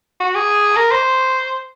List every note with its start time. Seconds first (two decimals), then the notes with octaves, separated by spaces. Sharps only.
0.20 F#4
0.35 G#4
0.76 A#4
0.91 C5